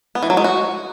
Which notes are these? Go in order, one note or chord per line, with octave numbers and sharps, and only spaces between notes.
B3
E3
F#3
G#3
F#4